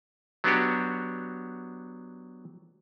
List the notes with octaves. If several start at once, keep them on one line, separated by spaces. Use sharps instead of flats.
F#3 B3 D4 F#4 G4